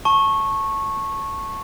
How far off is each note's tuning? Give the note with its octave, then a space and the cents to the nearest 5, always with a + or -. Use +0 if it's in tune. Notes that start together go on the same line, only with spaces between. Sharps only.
A5 +0 C#6 -15